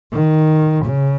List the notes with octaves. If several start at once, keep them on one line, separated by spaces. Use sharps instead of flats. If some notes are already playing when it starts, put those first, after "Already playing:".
D#3
C#3